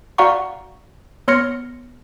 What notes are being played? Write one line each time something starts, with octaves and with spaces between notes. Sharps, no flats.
F#4 D5 F5 F#5 A#5 C#6
B3 C#5 C6 F6 A#6 C#7